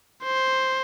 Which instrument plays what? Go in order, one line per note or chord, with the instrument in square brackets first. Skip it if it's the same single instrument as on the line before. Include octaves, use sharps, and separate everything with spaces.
[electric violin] C5